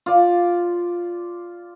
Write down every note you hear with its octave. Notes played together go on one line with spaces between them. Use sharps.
F4 D5